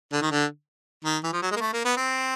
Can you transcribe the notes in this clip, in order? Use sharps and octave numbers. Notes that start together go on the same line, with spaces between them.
D3
D#3
D3
D#3
E3
F3
F#3
G#3
A#3
A3
A#3
B3
C4